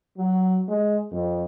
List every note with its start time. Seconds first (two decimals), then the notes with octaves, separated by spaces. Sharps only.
0.18 F#3
0.68 G#3
1.11 F2